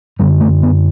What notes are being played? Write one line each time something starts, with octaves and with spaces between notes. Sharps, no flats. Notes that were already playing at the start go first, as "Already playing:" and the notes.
F#2 D3 G3
A3
B3